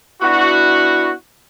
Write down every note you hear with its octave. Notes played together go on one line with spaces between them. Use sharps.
B3 D4 E4 F#4